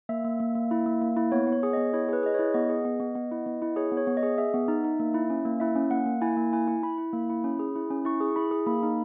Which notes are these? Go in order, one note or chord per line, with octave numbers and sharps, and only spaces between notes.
A#3 E5
A#3
A#3
A#3
E4
A#3
A#3
E4
B3 C#5
B3
C#5
G#4
B3 D#5
E4 C#5
G#4 B4
G#4 D#5
E4 C#5
B3 D#5
G#4
B3
B3
B3
E4
B3
E4
G#4 C#5
B3
C#5
B3
D#5
G#4
G#4 E5
B3
D#4
D#4
A#3
E4
C#4
A#3
E4 E5
C#4
A#3 F#5
A#3
E4 G#5
A#3
E4 G#5
E4
E4 B5
E4
A#3
E4
C#4
G#4
E4
C#4
E4 C#6
G#4
E4 B5
G#4
A#3 B5
D#4